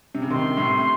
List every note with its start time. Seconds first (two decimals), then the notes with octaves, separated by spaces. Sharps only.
0.15 C3
0.22 C#3
0.30 C3 D#3 C6
0.57 A2 C3